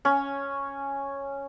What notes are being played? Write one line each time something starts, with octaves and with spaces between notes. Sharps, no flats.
C#4